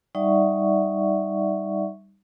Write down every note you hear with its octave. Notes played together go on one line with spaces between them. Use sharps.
G3 D#4 D5 E5 F#5 C#6